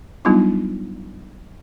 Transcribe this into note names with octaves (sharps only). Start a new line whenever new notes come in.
F#3 G3 B3 D4 D#4 F4